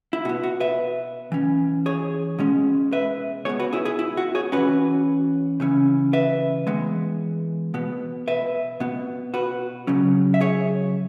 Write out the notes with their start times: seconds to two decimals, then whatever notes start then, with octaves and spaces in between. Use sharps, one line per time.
0.13 E4
0.25 B2 F#4
0.29 B3
0.43 F#4
0.60 B4 E5
1.32 E3 C#4
1.86 G#4 C#5
2.39 B2 G#3 C#4
2.93 B4 E5
3.45 B2 B3 G#4 C#5
3.60 F#4 B4
3.73 E4 G#4
3.85 E4 G#4
3.99 E4
4.17 F#4
4.35 G#4 C#5
4.52 E3 C#4 F#4 B4
5.60 C#3 E3 C#4
6.13 B4 E5
6.67 E3 G#3 B3
7.74 B2 B3
8.28 B4 E5
8.80 B2 B3
9.34 F#4 B4
9.87 C#3 F#3 C#4
10.34 E5
10.41 G#4 C#5